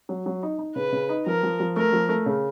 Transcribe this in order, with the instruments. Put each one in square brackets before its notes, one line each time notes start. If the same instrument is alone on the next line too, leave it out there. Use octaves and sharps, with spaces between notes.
[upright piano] F#3
F#3
D#4
D#4
[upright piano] C#3 [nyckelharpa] B4
[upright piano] C#3
D#4
[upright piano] F3 [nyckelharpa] A#4
[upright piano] F3
F3
[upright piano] A3 [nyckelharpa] A#4
[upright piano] F3
A3
C#3